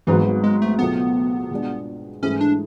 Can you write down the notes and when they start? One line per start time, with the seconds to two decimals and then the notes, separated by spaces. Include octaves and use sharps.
0.07 G#1 G#2 E3 F#3 B3
0.44 G#3
0.62 A3
0.79 C#2 B2 F#3 A3 B3
1.51 B2 G#3 D4
2.23 G#2 E3 A3 C#4 E4 G#4
2.41 D4